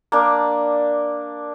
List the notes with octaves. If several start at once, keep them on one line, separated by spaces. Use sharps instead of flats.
A#3 D4